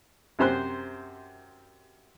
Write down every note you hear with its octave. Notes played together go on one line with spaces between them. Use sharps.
F#2 C3 C5 C6 F#6